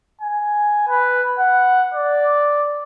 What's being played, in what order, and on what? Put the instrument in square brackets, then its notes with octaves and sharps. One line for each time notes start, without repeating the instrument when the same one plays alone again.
[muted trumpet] G#5
B4
F#5
D5